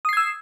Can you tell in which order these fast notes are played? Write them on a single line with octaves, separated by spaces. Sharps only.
D#6 C7 G#6 E6